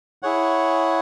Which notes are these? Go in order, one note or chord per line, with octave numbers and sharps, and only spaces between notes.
E4 G#4 C#5 F#5